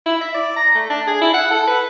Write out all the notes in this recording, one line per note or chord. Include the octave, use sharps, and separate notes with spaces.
E4
E5
D5
A#5
A3
D4
G#4
E4
F#5
A4
B4